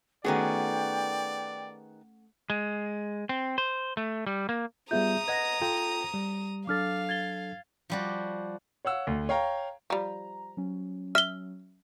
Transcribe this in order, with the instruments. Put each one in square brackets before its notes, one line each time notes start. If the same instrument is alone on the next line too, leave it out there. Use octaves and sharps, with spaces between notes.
[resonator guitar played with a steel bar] D#3 B3 G#4 [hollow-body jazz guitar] A3 C#4 F#4 [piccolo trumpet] D5 [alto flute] G5
[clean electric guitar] G#3
C4
C5
A3
G3
A#3
[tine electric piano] G3 B3 F4 [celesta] G#4 E5 G6 [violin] A#5 D#6
[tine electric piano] B4 D#5 F#5 [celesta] G#6 A#6
[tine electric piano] F4 A4 G5
G3
[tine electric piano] F#3 D4 A4 [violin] F5 [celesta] D6 F6 A6
[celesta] G#6 A6 G7
[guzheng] F3 G3 F#4
[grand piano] C#5 F5 F#5 E6
D2
C#5 F5 G5 A#5
[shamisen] F3 G3 [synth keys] A#5
[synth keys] F#3 C#4
[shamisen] E5 [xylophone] F6 G7